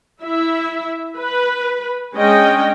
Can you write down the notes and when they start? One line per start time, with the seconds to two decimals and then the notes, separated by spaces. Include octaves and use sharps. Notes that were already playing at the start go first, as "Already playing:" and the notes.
0.22 E4 E5
1.19 B4
2.16 G#3 C#4 D4 D#5 G5